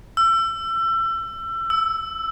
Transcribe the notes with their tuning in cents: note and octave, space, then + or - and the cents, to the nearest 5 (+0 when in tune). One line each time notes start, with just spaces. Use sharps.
E6 +30
E6 +0